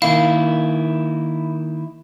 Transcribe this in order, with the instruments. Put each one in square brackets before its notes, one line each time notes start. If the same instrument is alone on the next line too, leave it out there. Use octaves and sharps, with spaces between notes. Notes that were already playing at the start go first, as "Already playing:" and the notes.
[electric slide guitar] D#3 A#3 E4 [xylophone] F5